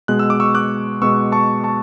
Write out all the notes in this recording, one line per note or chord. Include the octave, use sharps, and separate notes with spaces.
B2 G#3 B3 F#6
E6
D6
C#6 E6
D6 F#6
B2 G#3 B3 C#6 E6
A5 C#6
A5 C#6